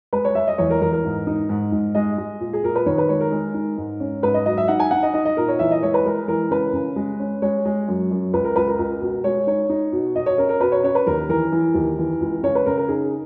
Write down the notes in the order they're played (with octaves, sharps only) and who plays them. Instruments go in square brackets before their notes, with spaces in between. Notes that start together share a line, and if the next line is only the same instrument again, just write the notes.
[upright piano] G#3 B4
C#5
G#3 E5
D#5
E2 C#5
A#4
E2 A#4
A#4
G#2
D#4
G#2
G#2
G#3 D#5
G#3
A#2
G#4
A#2 A#4
B4
D#3 C#5
B4
G#3 C#5
A#4
G#3
D#4
G#2
C#4
G#2 B4
D#5
F#3 D#5
E5
D#4 F#5
G#5
D#4 F#5
D#5
D#4 D#5
D#5
A#2 A#4
C#5
E3 E5
D#5
G#3 C#5
B4
G#3 A#4
E3 A#4
C#3 B4
C#3
G#3
C#4
G#3 C#5
G#3
F#2
F#2
C#2 B4
A#4
C#2 B4
A#4
C#2
B2
G#3 C#5
D#4 C#5
D#4
B2
B2 D#5
C#5
C#4 A#4
A#4
B2 B4
C#5
C#4 C#5
B4
D#2 A#4
E3 A#4
E3
D#2
E3
C#2
C#3 C#5
B4
C#3 A#4
A#4
D#4 G#4